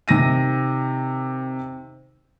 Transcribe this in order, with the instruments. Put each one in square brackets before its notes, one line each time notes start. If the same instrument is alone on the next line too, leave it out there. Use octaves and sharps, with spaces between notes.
[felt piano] C3 D#3 A#6 D#7